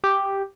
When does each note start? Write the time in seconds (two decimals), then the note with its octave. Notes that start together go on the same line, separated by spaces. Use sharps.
0.04 G4